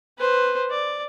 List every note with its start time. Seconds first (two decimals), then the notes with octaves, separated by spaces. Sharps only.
0.18 B4 C5
0.71 D5